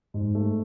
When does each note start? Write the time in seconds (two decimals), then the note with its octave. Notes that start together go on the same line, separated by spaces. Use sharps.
0.14 G#2
0.35 A3